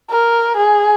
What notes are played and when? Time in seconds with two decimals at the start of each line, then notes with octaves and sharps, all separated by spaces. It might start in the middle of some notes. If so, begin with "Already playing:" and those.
0.10 A#4
0.57 G#4